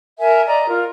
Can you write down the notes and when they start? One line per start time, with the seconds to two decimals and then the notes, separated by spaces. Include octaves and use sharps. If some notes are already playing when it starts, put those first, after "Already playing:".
0.19 A#4 E5 G#5
0.45 D5 D#5 A#5
0.68 F4 A#4